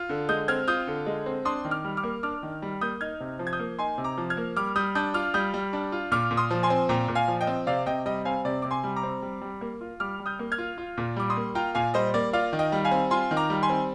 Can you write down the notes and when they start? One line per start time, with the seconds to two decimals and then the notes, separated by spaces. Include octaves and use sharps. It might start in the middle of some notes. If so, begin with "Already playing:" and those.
Already playing: F4
0.09 D3
0.29 G#3 D#6 G6
0.48 C4 F6 G#6
0.68 F4 D#6 G6
0.87 D3
1.06 G#3
1.26 C4
1.45 D4 C6 D#6
1.65 D#3
1.71 D6 F6
1.84 G3
1.97 D6 F6
2.03 A#3
2.23 D4 D6 F6
2.43 D#3
2.62 G3
2.81 A#3 D#6 G6
3.01 D#4 F6 G#6
3.20 C3
3.39 F3
3.47 G#6
3.53 D#6 G6
3.59 A#3
3.79 D#4 G#5 C6
3.98 C3
4.04 A#5 D6
4.18 F3
4.30 F6 G#6
4.37 A#3
4.56 G3 D6 F6
4.76 G3 D#6 G6
4.95 D4 D#6 G6
5.14 F4 D6 F6
5.34 G3 D#6 G6
5.54 G3
5.73 D4
5.92 F4
6.12 A#2 D6 F6
6.31 A#2
6.37 C6 D#6
6.51 F3
6.63 G#5 C6
6.70 C4
6.89 A#2 G5 A#5
7.08 A#2
7.15 F5 G#5
7.28 F3
7.41 D#5 G5
7.47 C4
7.67 C3 D5 F5
7.86 C3 D#5 G5
8.06 G3 D#5 G5
8.25 C4 F5 G#5
8.45 C3 D5
8.62 C3 D6
8.71 G#5 C6
8.84 G3
8.96 A#5 D6
9.03 C4
9.22 G3
9.41 G3
9.61 A#3
9.81 F4
10.00 G3 D6 F6
10.19 G3
10.26 D#6 G6
10.39 A#3
10.52 F6 G#6
10.58 F4
10.78 F4
10.97 A#2
11.16 G3 D6
11.30 C6 D#6
11.36 A#3
11.55 F4 G5 A#5
11.75 A#2 F5 G#5
11.94 G3 C5 D#5
12.14 A#3 D5
12.33 F4 D5 F5
12.53 D#3
12.59 D#5 G5
12.72 G3
12.84 F5 G#5
12.91 C4
13.11 F4 G#5 C6
13.31 D#3
13.37 A#5 D6
13.50 G3
13.63 G#5 C6
13.69 C4